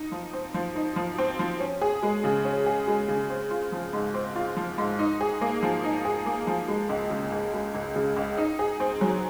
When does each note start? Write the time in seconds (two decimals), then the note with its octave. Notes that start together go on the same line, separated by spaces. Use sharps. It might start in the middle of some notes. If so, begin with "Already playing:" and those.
Already playing: D#4
0.12 F3
0.33 C4
0.54 F3
0.75 D#4
0.96 F3
1.18 C4
1.39 F3
1.60 C#4
1.81 G#4
2.03 G#3
2.24 C#3
2.45 C#4
2.66 G#4
2.87 G#3
3.08 C#3
3.30 C4
3.51 F4
3.72 F3
3.93 G#2
4.14 C4
4.36 F4
4.57 F3
4.78 G#2
4.99 D#4
5.21 G#4
5.41 A#3
5.63 F3
5.84 D#4
6.05 G#4
6.26 A#3
6.47 F3
6.68 G#3
6.89 C#2
7.10 C#3
7.32 C#2
7.53 G#3
7.74 C#2
7.96 C#3
8.17 C#2
8.38 D#4
8.59 G#4
8.80 C4
9.01 F#3